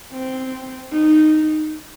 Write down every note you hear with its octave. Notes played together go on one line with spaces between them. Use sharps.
C4
D#4